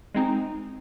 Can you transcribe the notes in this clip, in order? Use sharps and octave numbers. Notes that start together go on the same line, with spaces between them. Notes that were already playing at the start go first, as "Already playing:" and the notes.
G#3 C4 D#4